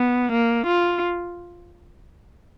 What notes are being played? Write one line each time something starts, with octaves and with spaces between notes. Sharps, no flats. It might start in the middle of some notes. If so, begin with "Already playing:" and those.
Already playing: B3
A#3
F4